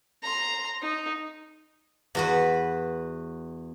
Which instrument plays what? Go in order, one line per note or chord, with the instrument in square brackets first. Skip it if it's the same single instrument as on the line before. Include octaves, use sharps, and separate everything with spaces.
[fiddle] A#5 C6
D#4
[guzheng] E2 F#4 B4